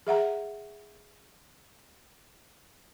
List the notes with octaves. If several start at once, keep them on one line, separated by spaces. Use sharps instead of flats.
G#4 E5 F#5 A#5